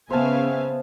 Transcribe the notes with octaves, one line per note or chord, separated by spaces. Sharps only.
C#3 B3 C5 E5 F5 G#5 A5